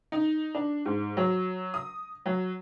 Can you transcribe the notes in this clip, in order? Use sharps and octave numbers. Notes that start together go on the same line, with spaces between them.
D#4
D4
G#2
F#3
D#6
F#3